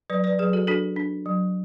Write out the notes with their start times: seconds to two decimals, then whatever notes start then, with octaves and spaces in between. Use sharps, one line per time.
0.10 F#3 B4 D5
0.24 B4 D5
0.39 F#3 G#4 B4
0.53 F#4 A4
0.67 D4 F#4 A4
0.96 D4
1.26 F#3